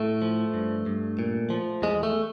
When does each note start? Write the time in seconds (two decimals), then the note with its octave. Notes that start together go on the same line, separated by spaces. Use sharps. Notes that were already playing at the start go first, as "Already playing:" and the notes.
Already playing: A2 A3
0.22 F3
0.54 G2
0.86 G2
1.19 A#2
1.50 F3
1.82 E2 G#3
2.03 A3